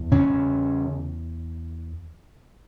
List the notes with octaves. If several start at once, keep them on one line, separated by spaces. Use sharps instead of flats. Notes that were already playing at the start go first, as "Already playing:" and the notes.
Already playing: E2
C#3 C#4